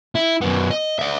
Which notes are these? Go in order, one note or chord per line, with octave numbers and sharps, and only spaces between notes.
E4
F#2 B3
D#5
D5 E5